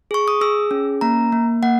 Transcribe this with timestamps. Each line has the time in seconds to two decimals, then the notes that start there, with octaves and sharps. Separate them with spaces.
0.11 G#4 C#6
0.28 D#6
0.41 G#4 E6
0.71 C#4
1.01 A#3 A#5
1.32 A#3
1.63 A#3 F#5